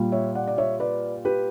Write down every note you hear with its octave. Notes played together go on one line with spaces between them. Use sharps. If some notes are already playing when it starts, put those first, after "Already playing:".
Already playing: A#2 G3
C#5 E5
D5 F#5
D5
C#5 E5
B4 D5
G4 B4